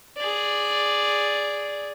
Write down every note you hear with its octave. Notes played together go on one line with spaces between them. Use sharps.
G#4 D5